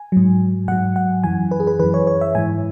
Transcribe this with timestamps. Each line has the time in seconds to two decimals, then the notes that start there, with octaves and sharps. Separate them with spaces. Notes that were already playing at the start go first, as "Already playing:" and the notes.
Already playing: G#5
0.12 G#2 F#3
0.68 G#2 F#3 F#5
0.96 F#5
1.24 F#2 E3 G#5
1.51 B4
1.60 G#4
1.67 B4
1.79 F#2 E3 B4
1.94 C#5
2.07 C#5
2.21 E5
2.35 G#2 E3 G#5